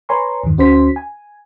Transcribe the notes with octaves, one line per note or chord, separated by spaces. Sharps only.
B4 C#5 G#5 A#5 C6 C#6
E2 G2 D#3
D2 C#4 F#4 C5 C6 B6
G#5